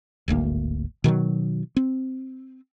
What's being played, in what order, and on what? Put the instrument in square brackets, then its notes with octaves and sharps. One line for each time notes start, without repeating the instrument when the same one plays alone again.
[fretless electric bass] D1 G#1 D2 A#3
B2 D#3 E3 F#3
C4